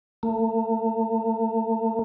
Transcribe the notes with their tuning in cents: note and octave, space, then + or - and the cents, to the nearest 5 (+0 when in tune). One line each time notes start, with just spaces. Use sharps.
A3 +40